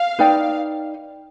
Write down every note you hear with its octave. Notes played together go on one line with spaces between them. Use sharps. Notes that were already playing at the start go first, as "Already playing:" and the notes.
Already playing: F5
D#4 B4 D5 G5